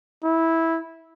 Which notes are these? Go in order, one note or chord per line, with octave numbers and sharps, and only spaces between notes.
E4